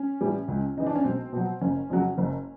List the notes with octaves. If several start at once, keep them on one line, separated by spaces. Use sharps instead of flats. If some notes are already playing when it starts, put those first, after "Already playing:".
Already playing: C#4
A2 E3 G3
C#2
C#3 E3 D#4
D4
C#4
B1 C4
B2 F#3
F#1 C#4
F2 C#3 F#3
F#1